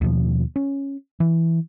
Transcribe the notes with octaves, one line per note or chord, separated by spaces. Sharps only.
D#2 B2 F3
C#4
E3